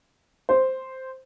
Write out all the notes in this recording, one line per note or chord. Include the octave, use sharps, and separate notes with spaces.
C5